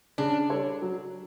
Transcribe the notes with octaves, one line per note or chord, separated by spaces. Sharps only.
C#3 D4
G3 D4 A4 C#5
F#3